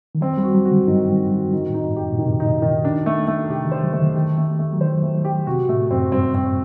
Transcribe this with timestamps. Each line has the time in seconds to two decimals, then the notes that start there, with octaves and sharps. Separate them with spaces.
0.15 D#3
0.21 F#3 C4
0.38 G3
0.43 F#4
0.55 F#3
0.65 F#4
0.71 D3
0.87 G2 D#3
1.09 C4
1.31 F#4
1.53 D#3
1.69 A2
1.74 D#4
1.86 G2
1.96 G4
2.02 F#2
2.10 A#2
2.18 C3 D#3
2.40 D#4
2.62 D#3
2.85 D4
3.06 A3
3.27 A3
3.50 C3 G4
3.65 D#3
3.72 C5
3.83 F#3
3.93 D3 A3
3.99 D#3
4.16 D#3 G4
4.38 A3
4.59 A3
4.72 F#3
4.81 D#3 C5
5.03 A3
5.25 G4
5.47 C3 F#4
5.68 A2 A3
5.90 F#2 C4
6.12 G2 C4
6.35 C4